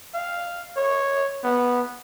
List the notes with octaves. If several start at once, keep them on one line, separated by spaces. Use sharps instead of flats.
F5
C#5
B3